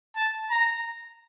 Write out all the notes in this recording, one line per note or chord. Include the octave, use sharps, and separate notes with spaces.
A5
A#5